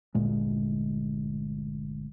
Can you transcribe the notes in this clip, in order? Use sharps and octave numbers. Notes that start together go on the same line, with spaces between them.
G1 D2 A#2 G#3